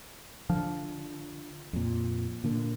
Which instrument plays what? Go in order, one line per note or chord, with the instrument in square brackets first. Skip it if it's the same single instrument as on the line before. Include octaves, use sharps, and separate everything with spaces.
[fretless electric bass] D3 [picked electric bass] F3
[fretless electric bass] F2 A#2
A#2 D3 A#3